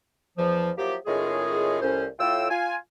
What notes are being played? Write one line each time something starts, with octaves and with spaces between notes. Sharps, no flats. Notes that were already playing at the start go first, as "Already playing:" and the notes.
E2 F3
F3 F#3 A#3 E4 G4
A2 D#3 G#3 C#4 F4 G#4
C2 A2 C#4 C5
A2 F4 G5 E6
F4 G#5